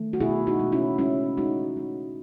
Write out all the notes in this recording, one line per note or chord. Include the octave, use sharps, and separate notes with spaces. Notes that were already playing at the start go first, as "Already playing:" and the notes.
Already playing: D#3 A3
F#4
B2 E4 G#4
D#4 F#4
G#3
C#4 E4
G#3 C#4 E4
G#3 D#4 F#4
G#3